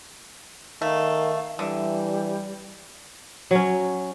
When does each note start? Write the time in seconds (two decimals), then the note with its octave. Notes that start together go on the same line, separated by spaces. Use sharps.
0.82 D#3 A3 F5
1.59 D3 E3 G3 E5
3.51 F#3 C#4